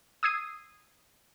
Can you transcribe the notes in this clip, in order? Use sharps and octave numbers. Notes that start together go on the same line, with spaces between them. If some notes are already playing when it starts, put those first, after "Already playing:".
D#6 E6 G#6 C7 D#7